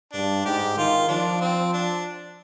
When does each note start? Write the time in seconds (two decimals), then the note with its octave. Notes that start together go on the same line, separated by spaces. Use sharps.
0.13 G2 D4
0.45 G#2 G4
0.77 D#3 F4
1.09 F3 D4
1.41 C4
1.73 D4